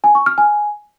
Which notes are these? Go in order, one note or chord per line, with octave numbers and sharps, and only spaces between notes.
G#5
C#6
F6
G#5